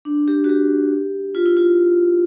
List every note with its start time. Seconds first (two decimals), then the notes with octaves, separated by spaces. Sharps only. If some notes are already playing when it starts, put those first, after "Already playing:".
0.05 D4
0.28 G4
0.44 F#4
0.49 G4
1.35 F4
1.46 E4
1.57 F4